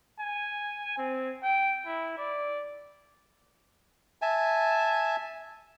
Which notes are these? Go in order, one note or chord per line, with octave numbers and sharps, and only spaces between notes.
G#5
C4
G5
E4
D5
E5 G#5 A5